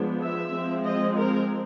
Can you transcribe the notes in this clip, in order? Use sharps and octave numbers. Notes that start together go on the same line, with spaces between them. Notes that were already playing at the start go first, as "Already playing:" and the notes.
Already playing: F3 G#3 B3 D4
E5
F3 G#3 C4
D#5
A#4